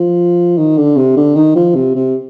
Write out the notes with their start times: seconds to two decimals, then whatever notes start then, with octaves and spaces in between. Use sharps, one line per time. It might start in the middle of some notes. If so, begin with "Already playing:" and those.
Already playing: F3
0.58 D#3
0.77 D3
0.97 C3
1.17 D3
1.36 D#3
1.55 F3
1.75 C3
1.95 C3